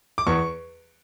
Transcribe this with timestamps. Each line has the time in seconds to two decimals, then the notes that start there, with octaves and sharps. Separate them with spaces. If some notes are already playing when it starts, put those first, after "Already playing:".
0.18 D6
0.27 E2 C#6